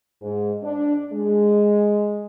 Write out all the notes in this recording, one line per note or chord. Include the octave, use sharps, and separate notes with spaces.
G#2
D4
G#3